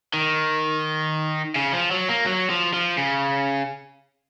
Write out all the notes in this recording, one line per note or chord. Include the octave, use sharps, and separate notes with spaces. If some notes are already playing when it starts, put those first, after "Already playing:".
D#3
C#3
F3
F#3
A#3
F#3
F3
F3
C#3